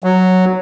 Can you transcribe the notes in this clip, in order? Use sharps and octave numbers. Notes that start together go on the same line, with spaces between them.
F#3